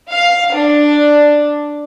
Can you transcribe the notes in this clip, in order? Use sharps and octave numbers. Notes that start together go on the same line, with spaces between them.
F5
D4